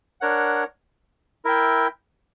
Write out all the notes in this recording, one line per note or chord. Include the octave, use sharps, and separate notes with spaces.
D4 A#4 C#5 F#5
E4 A#4 E5 G5